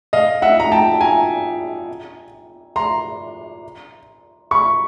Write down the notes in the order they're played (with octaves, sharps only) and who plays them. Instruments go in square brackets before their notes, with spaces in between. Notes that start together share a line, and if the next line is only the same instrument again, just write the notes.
[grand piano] D#5 F5
E5 F#5
A#5
G5 A5
G#5 A#5
A#5 C6
B5 C#6